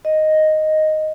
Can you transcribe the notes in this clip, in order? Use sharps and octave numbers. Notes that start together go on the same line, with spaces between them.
D#5